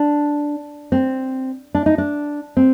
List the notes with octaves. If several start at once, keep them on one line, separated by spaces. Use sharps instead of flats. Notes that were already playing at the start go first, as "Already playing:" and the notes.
Already playing: D4
C4
D4
D#4
D4
C4